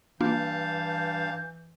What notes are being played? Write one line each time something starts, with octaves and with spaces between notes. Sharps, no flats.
G2 E3 A#3 D4 F4 F5 A5 G6